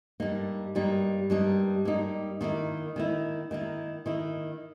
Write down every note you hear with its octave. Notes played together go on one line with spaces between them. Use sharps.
G2 G3 A#3 D#4
G2 G3 A#3 D#4
G2 G3 A#3 D#4
G2 G3 A#3 D#4
D#3 A#3 E4
D#3 A#3 E4
D#3 A#3 E4
D#3 A#3 E4